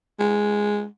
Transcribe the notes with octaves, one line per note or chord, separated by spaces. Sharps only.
G#3